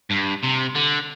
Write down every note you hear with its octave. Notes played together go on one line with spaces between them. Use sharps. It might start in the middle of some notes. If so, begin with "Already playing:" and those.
G2
C3
D3